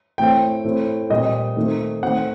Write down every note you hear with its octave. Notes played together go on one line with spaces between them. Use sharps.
A2 A3 C4 G5
A2 A3 C4
A#2 G3 C4 D#5
D#3 A3 C4
D#3 A3 C4 F#5